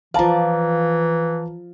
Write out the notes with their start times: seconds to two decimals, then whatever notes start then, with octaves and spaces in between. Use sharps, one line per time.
0.14 E3 F3 D5 F5 A5 A#5